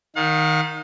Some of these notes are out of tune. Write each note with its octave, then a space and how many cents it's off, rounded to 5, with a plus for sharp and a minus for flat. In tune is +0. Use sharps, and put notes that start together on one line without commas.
D#3 +0 F5 +45